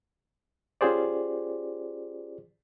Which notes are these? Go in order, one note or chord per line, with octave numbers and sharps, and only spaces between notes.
C#4 F4 G4 G#4 C5 D5